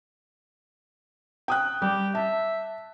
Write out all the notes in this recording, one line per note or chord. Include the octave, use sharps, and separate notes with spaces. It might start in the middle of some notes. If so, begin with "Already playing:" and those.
G5 D#6 F#6
G3 G4
E5 A5